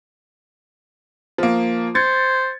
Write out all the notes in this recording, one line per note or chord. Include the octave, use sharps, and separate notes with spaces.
F3 A#3
C5 G#6 A6 C#7